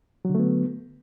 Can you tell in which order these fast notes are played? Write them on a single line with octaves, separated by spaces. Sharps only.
F#3 D3 A3 B3